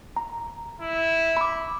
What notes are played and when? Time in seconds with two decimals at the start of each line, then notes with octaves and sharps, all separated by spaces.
0.16 A#5
0.81 E4
1.37 B5 D6